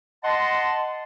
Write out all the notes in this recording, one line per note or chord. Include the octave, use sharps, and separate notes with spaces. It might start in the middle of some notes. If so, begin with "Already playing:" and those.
D#5 F#5 A5 C6